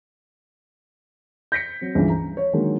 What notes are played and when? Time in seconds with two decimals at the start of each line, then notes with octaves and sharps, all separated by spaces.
1.52 G6 A#6 B6 C#7
1.81 F#3 C4
1.95 C#2 G2 D3 E3 F3
2.10 A#5
2.37 C#5
2.53 D3 D#3 F#3 G#3 A#3